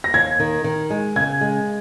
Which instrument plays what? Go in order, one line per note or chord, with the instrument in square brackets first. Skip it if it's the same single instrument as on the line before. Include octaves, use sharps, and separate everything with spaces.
[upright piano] A#6
[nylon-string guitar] D#2 [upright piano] G#6
[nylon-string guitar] D#3
D#3
G#3
[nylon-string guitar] C#3 [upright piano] G#6
[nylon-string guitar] G#3